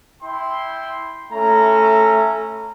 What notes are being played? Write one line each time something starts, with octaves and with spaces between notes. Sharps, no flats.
E4 G5 C6
A3 C#4 E4 A#5